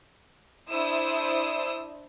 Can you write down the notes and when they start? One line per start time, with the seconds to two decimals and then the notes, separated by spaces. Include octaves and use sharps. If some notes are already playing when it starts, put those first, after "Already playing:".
0.68 D4 E4 C5 D#6 E6